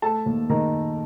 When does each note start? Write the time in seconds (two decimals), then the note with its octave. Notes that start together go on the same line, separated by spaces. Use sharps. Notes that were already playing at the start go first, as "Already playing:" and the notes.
0.02 A3 A4 A5
0.26 D#2
0.49 D#3 A#4 A#5